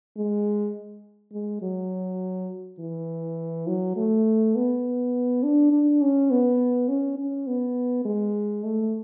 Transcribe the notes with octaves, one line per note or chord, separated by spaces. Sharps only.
G#3
G#3
F#3
E3
F#3
A3
B3
D4
D4
C#4
B3
C#4
C#4
B3
G#3
A3